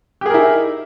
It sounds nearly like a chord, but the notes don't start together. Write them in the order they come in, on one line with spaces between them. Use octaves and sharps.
G4 G#4 A#4 E4 D#4